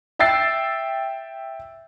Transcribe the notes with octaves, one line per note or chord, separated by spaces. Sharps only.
E5 G5 E6 A6 C7